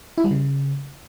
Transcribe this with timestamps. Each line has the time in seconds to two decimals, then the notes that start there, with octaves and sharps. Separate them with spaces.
0.18 E4
0.24 G3
0.31 C#3